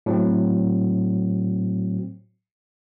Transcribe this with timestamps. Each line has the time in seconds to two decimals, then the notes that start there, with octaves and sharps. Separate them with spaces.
0.06 A2 F#3 C4